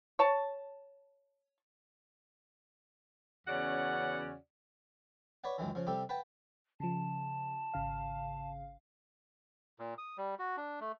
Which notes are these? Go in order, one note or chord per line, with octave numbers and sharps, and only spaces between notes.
C#5 A5
E2 C#3 C#4 F#4 D5 F#5
B4 C#5 D5 F#5
C#2 F#2 D#3 E3
C#3 F3
C3 G3 G4 A4
B4 F#5 G5 A5
C#3 F3 A5
G#1 C#3 F5
A#2
D#6
G3
F#4
D4
A3